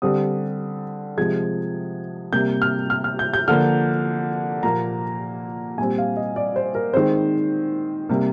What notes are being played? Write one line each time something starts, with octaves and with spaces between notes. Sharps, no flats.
D3 G3 C4 D#6
C3 F3 G#3 G#6
C3 G3 A#3 G6
F6
F6
F6
G6
G6
D3 F3 A#3 F6
A#2 F3 A#3 A#5
A#2 G3 C4 G#5
F5
D#5
D5
C5
A#4
D#3 G#3 C4 C5
C3 G3 A#3